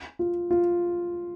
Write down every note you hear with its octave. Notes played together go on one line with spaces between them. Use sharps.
F4
F4